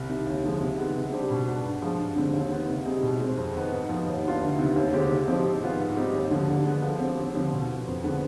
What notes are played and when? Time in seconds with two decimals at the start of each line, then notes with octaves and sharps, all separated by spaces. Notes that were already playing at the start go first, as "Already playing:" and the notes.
Already playing: C2
0.09 C3 D#3
0.26 D#2
0.43 D3 F3 G#3
0.61 C3
0.78 D#3 G#3 B3
0.95 C3
1.12 G3 D4 G4 C5
1.30 B2
1.48 G#3 B3 D4
1.65 G2
1.82 F3 G#3
1.99 G2
2.16 D3 G#3 C4
2.34 D#2
2.52 D#3 B3
2.68 C3
2.85 G3 C4 D#4 G#4
3.03 B2
3.20 G#3 C4
3.37 F2
3.55 D#3 B3 D#4
3.72 G#2
3.89 F3 B3 D#4
4.06 D#2
4.23 D#3 B3 D4 F4
4.41 D2
4.58 C3 D#3 B3
4.76 D#2
4.93 D3 G#3 C4 G4
5.11 C3
5.28 F3 C4 D#4 G4
5.45 G#2
5.62 D#3 B3 F4 G#4
5.80 G#2
5.96 G3 C4 D#4 G4
6.13 D#2
6.31 D3 F3
6.48 D3
6.66 G#3 B3
6.82 F3
7.00 C4 G4
7.17 D#2
7.35 D3 F3 C4
7.52 B2
7.69 B3 F4
7.87 F2
8.04 D3 G#3 B3